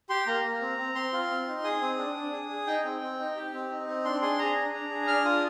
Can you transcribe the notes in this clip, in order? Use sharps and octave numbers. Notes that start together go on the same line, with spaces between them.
G4 C6
A#3 A#5
A#3
C4
C4
C4 C6
F4
C4
D#4
G#4 D#6
C4
D4
D4
G#4
G#4
D#4 G5
C4
C4
D#4
G4
C4
D#4
C4
D4 C6
G#4 C6
G#4 A#5
D4
D4
G#4
D4 F6
F4 D#6